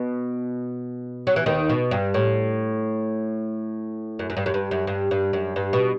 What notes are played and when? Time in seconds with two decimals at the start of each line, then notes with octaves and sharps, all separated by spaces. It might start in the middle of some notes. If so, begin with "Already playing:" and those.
Already playing: B2
1.27 F#3
1.36 E3
1.46 D#2 D#3
1.69 B2
1.91 G2
2.14 A2
4.19 F#2
4.30 F#2
4.37 G2
4.46 F#2
4.54 G2
4.71 F#2
4.87 G2
5.11 G2
5.33 F#2
5.56 G2
5.73 B2